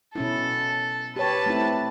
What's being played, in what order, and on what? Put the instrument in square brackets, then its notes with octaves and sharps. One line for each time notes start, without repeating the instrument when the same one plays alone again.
[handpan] B2 C#4 E4 [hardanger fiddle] A4
[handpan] G4 C#5 [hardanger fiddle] B4 A5
[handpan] A3 C4 E4